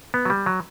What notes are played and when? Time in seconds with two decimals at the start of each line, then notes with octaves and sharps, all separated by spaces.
0.14 B3
0.25 F#3
0.30 G3
0.46 F#3